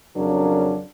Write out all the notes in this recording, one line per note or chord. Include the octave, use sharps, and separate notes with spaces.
F2 C#3 F#3 D4 A#4